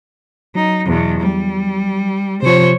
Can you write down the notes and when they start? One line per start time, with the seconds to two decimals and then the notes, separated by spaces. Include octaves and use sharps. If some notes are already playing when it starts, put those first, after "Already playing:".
0.55 F#3 D#4
0.87 E2 B2
1.20 G3
2.43 C3 F3 C5 C#5